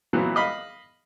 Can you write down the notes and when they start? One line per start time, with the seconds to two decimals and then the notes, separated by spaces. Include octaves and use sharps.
0.13 A#2 E3 F#3 B3 C4
0.36 D#5 F5 B5